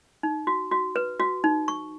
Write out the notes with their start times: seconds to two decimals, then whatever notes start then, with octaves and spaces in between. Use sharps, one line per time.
0.23 D#4
0.47 F#4
0.71 F#4
0.96 B4
1.20 F#4
1.44 D#4
1.68 C#6